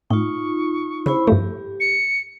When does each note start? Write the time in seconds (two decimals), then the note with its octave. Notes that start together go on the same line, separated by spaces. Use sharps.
0.10 A2 D#4 F4 C#6
1.06 C#3 E4 C5 B5
1.27 G2 F3 A3 G4
1.80 C#7